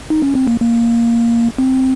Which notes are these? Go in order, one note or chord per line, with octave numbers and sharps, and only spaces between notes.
D#4
C#4
C4
A#3
A#3
C4